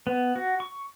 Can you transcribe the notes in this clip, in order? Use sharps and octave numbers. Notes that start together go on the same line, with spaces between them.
B3
F#4
C#6